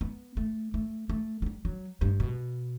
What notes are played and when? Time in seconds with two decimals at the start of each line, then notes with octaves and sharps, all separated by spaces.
0.01 B3
0.37 A3
0.74 A3
1.09 A3
1.42 F#3
1.46 G3
1.65 F#3
2.01 G2
2.20 B2